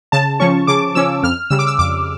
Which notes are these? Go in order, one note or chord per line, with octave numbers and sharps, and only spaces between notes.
C#3 A5
F3 C#4 C#6
C#3 D6
F3 C#4 E6
F2 F6
C#3 G3 E6
D6
E6
F2 D6